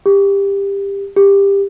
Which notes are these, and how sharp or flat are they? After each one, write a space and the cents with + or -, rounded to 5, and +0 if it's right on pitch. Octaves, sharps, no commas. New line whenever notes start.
G4 +20
G4 +20